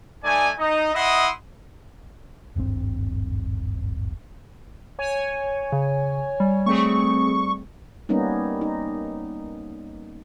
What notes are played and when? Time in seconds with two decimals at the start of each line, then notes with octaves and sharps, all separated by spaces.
0.24 A3 D#4 D5 G#5
0.59 D#4 D#5
0.94 E4 D#5 E5 F#5 C6 D#6
2.56 D#1 G#1 G2 C4
4.99 C#5 G#5
5.72 C#3
6.40 G3
6.66 A3 C4 G#4 C#6
8.09 G3 A#3 B3 C#4 D#4
8.61 D#4